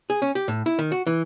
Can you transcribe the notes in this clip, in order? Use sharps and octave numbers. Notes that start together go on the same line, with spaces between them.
G#4
C#4
G4
A2
E4
D#3
F#4
E3